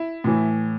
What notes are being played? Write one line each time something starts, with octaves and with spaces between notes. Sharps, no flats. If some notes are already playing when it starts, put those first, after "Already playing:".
Already playing: E4
A2 E3